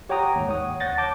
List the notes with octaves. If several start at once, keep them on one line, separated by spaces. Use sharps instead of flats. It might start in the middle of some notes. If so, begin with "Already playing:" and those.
G4 C#5 F#5 G5 A#5 D#6
D#2 G#2
C#5 F#5 D#6
D#2 C#5 F#5 G6 A6 A#6
A5 D6 G6